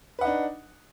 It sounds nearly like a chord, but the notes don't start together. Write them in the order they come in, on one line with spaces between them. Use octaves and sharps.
B4 F#5 D#4 D4